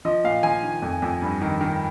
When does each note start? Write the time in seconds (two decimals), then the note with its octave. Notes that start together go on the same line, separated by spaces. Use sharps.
0.05 F3 D#5
0.24 A#2 F5
0.43 F3 G#5
0.63 D#3
0.82 F2
1.02 F2
1.22 G2
1.42 D#3
1.61 D#3